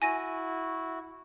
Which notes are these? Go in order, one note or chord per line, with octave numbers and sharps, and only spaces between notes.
E4 F#4 G#5 A#6 D#7